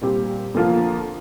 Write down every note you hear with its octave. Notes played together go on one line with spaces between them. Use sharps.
A#2 G3 C4 G4
F2 D3 F3 A#3 F4